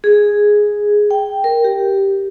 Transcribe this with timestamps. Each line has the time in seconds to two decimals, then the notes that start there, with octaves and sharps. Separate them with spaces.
0.04 G#4
1.11 G5
1.44 A#4
1.64 G4